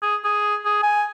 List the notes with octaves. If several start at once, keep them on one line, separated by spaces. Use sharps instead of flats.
G#4
G#4
G#4
G#5